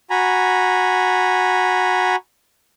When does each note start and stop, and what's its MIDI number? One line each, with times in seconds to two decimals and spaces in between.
0.10 2.16 66
0.10 2.16 80
0.10 2.16 82
0.10 2.16 83